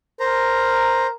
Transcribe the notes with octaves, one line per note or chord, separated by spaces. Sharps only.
A#4 C5 A#5